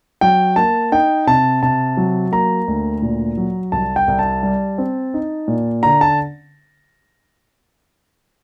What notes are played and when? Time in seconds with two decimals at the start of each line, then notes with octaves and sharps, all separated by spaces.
0.21 F#3 G5
0.56 A#3 A5
0.92 D#4 G5
1.27 C3 A5
1.63 C3 A5
1.97 F#3
2.32 A#3 A#5
2.68 D2
3.02 A#2
3.37 F#3
3.72 C2 A5
3.96 G5
4.08 C2
4.19 A5
4.43 G3
4.78 C4
5.14 D#4
5.48 A#2
5.83 D3 A#5
6.01 A5